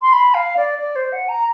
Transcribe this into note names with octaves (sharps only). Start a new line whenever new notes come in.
C6
B5
F5
D5
D5
C5
F#5
A#5